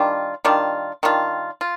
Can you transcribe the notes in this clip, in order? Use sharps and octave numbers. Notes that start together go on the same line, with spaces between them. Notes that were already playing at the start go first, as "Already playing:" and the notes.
Already playing: D#3 G3 D4 F4
D#3 G3 D4 F4
D#3 G3 D4 F4
F4